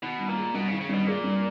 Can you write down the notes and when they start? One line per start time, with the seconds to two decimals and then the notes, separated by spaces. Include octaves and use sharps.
0.02 B2 D#3
0.19 G2
0.28 A#2
0.37 G#3
0.54 G2 B2
0.68 C#3
0.72 D#3
0.81 C#3
0.89 G2
0.94 B2
1.07 A#2 G#3
1.24 G2